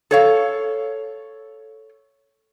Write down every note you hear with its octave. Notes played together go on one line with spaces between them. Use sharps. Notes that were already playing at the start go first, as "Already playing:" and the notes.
A4 C#5 F5